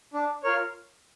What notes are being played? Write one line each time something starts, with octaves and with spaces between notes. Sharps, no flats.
D4
F4 A#4 C#5